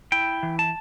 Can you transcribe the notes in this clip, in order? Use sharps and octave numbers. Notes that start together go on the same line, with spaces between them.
E4 G5
E3
A5